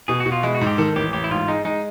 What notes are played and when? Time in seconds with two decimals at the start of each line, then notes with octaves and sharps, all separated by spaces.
0.08 B2 G#4
0.20 F#4
0.26 B2
0.32 F4
0.43 G#3 E4
0.55 F#4
0.61 G#2
0.67 G4
0.78 D#3 A4
0.96 A1 G4
1.13 A1 G4
1.24 E4
1.31 G#2 F4
1.48 G#3 D#4
1.65 G#3 D#4